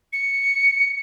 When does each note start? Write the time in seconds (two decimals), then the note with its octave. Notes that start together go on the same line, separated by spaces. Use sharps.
0.13 C#7